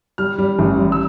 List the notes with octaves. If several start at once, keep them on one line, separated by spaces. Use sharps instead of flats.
G3 F6
G3
A1
G3
E6